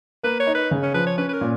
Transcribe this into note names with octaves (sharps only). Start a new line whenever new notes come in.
A#3 B4
C#5
D#4
B4
C#3
C#4
F3 B4
C#5
C#4 B4
B4
A#4
A#2